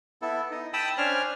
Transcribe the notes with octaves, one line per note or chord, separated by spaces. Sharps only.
B3 E4 A4
D#4
G5 A5 B5 D#6 E6
C#4 D4 C5 D5 G#5 F6